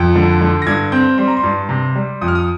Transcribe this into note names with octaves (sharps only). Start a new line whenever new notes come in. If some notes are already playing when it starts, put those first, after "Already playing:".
Already playing: F2
D3
D3
A#6
G2 G#6
C4 G6
G3 C6
A#5
C6
G2
C3
G3
F2 D#6
F6
D#6